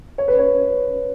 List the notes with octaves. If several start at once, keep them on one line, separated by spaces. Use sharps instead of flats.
C#5
B4
C#5